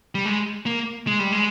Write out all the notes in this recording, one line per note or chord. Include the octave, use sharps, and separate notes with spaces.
G3
G#3
A#3
G#3
G3
G#3